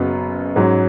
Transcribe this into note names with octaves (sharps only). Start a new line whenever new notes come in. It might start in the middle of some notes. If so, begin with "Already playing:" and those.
Already playing: F#1 F#2 C#3 B3 F#4
G#2 F#3 C#4